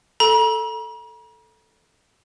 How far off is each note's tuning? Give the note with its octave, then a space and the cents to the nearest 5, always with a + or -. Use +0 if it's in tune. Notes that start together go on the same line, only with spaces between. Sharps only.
A4 +0 A#5 +45